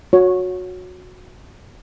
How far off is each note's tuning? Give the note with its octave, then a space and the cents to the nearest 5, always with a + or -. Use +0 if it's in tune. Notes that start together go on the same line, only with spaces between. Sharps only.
F#4 -20 C#5 +0